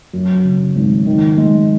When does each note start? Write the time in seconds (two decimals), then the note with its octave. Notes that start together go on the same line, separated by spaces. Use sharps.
0.13 F#2
0.44 C#3
0.76 G#1
1.06 D#3
1.37 G#3